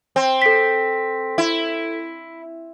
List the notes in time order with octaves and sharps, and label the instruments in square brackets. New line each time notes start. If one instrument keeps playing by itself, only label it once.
[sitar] C4
[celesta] A4 B6
[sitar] E4